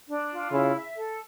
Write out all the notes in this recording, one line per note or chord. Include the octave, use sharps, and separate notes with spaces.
D4
F4
C#3 E4
E5
A4